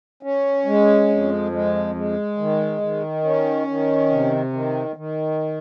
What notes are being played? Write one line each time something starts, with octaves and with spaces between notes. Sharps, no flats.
C#4
G#3
F2
G#3
G#3
D#3
D#3
C#4
D#3
C3
D#3
D#3